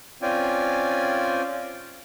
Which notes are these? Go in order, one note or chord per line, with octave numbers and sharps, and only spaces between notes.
C4 C#4 F4 D5 G5 G#5